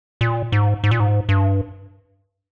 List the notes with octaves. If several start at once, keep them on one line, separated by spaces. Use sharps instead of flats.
A#2
G#2
G#2
A#2
G#2
G2